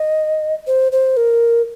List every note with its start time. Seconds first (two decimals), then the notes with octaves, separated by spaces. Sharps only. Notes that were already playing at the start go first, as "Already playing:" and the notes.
Already playing: D#5
0.67 C5
0.92 C5
1.17 A#4